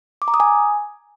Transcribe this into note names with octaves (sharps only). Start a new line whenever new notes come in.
D6
A#5
D#6
G#5